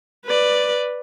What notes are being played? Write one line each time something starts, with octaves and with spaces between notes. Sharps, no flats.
B4 D5